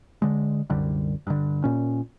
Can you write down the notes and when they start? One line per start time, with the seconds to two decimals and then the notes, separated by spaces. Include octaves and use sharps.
0.22 D3 G#3
0.70 C2 F#2 D3 G3
1.27 G2 D3
1.64 A#2 C#4